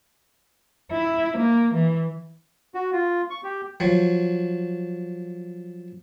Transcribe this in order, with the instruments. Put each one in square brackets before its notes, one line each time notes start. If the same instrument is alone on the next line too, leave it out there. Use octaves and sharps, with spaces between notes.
[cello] E4
A#3
E3
[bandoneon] F#4
F4
C#6
G4
[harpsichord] F3 F#3